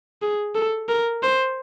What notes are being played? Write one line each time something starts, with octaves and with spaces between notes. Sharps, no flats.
G#4
A4
A#4
C5